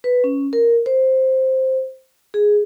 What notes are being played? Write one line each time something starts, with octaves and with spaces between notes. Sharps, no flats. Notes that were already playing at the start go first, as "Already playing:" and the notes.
B4
C#4
A#4
C5
G#4